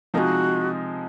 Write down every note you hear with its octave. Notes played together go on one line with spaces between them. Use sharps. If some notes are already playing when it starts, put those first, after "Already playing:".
C3 F3 G#3 D#4 F#4 A#4